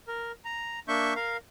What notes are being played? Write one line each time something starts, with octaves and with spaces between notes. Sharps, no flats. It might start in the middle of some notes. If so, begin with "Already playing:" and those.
A#4
A#5
A#3 D4 E5 C#6 G6
A#4 F5